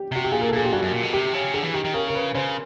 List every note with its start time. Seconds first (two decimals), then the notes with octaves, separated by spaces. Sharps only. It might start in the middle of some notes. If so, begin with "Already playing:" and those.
Already playing: G4
0.12 C3 F#4
0.24 G4
0.32 A#2 G#4
0.41 A#4
0.49 A4
0.53 A#2 G#4
0.65 G4
0.72 G2 F#4
0.82 F#2
0.92 A#2
1.03 B2
1.13 C3 G4
1.33 C#3
1.54 D3 G#4
1.63 E3
1.74 D#3 G4
1.84 D#3
1.94 C#3 A#4
2.08 A#4
2.15 B4
2.35 C#3 C5